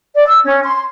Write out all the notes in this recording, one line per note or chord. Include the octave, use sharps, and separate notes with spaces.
D5
E6
C#4
C6